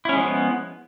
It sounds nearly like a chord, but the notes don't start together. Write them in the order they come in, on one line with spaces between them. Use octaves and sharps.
E4 C#4 G#3 F3 B3